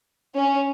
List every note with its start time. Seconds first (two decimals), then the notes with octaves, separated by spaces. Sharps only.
0.36 C#4